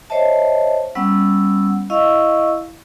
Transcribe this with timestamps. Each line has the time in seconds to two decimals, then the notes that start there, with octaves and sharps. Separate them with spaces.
0.10 C5 C#5 D#5 E5 A5
0.95 G3 B3 C#4 F#5 E6
1.90 E4 D#5 F5 C#6 E6